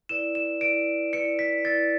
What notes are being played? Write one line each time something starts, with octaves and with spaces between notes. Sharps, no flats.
E4 B4 D5 E7
E7
E4 B4 D5 D7
E4 B4 D5 C#7
B6
E4 B4 D5 A6